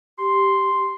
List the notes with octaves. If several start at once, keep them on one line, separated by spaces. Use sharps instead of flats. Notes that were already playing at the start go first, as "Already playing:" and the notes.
G4 C6